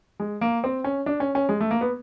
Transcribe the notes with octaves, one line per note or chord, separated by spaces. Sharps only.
G#3
A#3
C4
C#4
D4
C#4
C#4
G#3
A3
A#3
B3